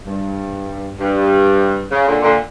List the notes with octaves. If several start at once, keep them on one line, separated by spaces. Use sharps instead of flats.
G2
G2
C#3
A#2 D3
A#2 D3